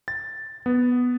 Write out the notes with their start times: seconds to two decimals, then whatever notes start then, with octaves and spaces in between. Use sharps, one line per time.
0.08 A6
0.66 B3